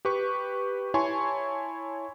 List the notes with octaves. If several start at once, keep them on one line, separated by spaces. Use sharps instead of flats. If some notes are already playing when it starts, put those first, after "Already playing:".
G4 B4 C#6
E4 C#5 G#5 A5 C6 C#6